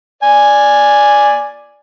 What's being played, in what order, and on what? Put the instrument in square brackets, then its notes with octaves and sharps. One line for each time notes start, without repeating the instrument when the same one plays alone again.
[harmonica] D5 G#5